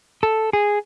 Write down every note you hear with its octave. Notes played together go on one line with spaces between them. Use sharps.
A4
G#4